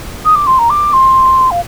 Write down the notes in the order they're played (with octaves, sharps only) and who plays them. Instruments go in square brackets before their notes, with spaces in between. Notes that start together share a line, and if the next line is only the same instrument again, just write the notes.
[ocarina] D#6
D6
C6
A#5
D6
C6
F5